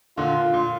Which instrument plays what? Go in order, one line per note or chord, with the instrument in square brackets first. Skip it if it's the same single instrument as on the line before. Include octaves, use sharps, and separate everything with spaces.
[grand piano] A#2 D3 [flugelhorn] F4
[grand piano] A#2